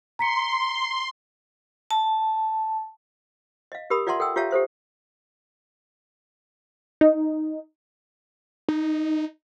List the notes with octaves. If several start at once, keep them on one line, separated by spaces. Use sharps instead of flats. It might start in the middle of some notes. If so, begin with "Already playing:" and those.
A#5 C6 B6 C#7
A5
D#5 F5
G4 A#4 B5 D#6
F4 D5 E5 F#5 A5 C6
A4 F#5 G5 E6
F4 G4 C#5 E5 F5 A5
G4 A4 C5 E5
D#4
D#4